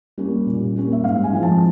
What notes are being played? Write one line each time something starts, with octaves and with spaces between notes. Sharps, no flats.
G3 A#3 C#4
A#2
G3 A#3 C#4
E5
G#2 F5
G#5
F3 G#3 C4
A5